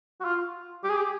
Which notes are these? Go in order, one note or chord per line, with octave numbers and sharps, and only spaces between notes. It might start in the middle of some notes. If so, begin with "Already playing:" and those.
F#4
F4
G4
G#4
G4